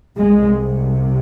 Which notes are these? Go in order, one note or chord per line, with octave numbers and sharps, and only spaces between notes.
C2 C3 G#3